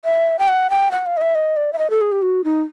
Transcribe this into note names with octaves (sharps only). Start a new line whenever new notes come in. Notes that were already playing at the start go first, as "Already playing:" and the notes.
E5
G5
F#5
G5
F#5
F5
D#5
E5
D#5
D5
E5
D#5
A4
G#4
G4
F#4
D#4